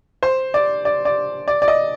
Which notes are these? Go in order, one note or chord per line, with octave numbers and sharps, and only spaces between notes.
C5
D5
D5
D5
D5
D5
D#5